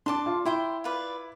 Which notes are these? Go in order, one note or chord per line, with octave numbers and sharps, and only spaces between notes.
D4 D5 A5 C6
F4
E4 C5 G5 C6
F4 B4 D5